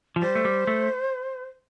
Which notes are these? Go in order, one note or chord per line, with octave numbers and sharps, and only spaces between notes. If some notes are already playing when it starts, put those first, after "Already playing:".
F3
G3 C5
A3
G3
A3